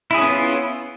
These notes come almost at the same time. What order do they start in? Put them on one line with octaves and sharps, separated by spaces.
E4 G#4 C#4 B3 F4